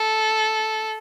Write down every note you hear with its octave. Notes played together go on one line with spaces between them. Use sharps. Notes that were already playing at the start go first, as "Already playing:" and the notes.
Already playing: A4